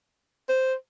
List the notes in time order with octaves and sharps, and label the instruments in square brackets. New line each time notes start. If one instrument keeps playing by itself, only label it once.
[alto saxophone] C5